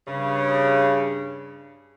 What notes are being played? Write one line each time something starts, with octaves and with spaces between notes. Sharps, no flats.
G2 C#3